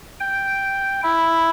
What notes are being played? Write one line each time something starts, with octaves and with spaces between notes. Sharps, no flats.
G5
E4